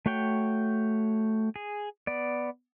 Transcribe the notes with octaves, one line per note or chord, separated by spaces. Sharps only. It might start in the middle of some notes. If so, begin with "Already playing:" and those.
A3 F#4 C#5 G5
G#4
B3 D5